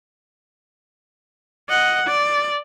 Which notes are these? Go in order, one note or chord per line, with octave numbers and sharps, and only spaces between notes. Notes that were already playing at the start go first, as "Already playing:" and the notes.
D#5 F#5
D5